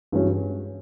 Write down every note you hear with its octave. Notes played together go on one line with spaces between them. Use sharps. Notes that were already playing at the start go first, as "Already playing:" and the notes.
G2 E3 G#3 C#4 F#4